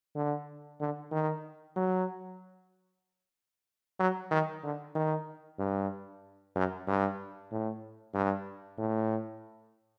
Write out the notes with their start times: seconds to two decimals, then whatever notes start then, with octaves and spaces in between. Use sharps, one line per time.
0.16 D3
0.80 D3
1.11 D#3
1.76 F#3
4.00 F#3
4.31 D#3
4.63 D3
4.95 D#3
5.59 G2
6.56 F#2
6.87 G2
7.51 A2
8.14 G2
8.78 A2